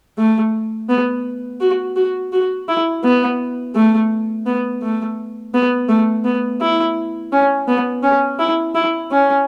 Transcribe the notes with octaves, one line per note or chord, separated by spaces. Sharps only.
A3
B3
F#4
F#4
F#4
E4
B3
A3
B3
A3
B3
A3
B3
E4
C#4
B3
C#4
E4
E4
C#4